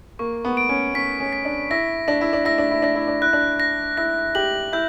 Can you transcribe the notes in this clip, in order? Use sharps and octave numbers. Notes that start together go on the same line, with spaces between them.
A#3 C#6
B3
D7
C#4
C#4 B6
C#4
B6
D4
E4 A#6
D4 A#6
E4
D4
E4 A#6
D4
E4
D4 A#6
E4
D4
E4 F#6
D4
A#6
E4 A#6
G4 F#7
E4 G6